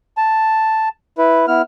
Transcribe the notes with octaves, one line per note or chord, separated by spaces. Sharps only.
A5
E4 B4
B3 E4 F6